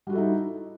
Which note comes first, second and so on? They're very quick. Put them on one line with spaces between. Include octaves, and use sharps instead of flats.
G3 F#4 A4 E4 D#4